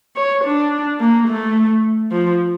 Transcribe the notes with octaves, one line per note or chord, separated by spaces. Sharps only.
C#5
D4
A#3
A3
F3